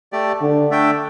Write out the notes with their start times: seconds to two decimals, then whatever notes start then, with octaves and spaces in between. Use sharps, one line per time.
0.12 A3 G4 D5
0.41 D3
0.71 A3 D4 A4 E5 G5